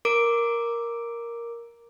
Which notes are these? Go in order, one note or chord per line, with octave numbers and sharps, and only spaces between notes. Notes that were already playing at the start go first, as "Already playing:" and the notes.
A#4 D6 D7